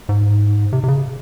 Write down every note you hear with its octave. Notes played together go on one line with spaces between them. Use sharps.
G#2
C3
C3
C#3